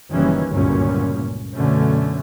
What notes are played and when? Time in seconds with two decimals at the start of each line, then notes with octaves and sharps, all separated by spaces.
0.12 F#1 A#2 D#3 E3 G3 C#4
0.50 G1 C#2 F#2 A#2 C#4
1.55 F#2 B2 D3 A3 C#4